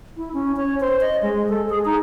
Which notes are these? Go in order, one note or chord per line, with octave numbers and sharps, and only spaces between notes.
E4
C#4
C#5
C5
D#5
G#3
A4
G#4
D#4